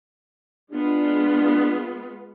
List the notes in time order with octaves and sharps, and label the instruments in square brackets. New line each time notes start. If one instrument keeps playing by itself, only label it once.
[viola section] G#3 B3 F4 [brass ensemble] D4